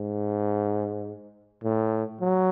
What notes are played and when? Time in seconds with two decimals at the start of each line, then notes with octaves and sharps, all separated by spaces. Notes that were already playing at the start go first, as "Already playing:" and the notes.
Already playing: G#2
1.64 A2
2.21 F#3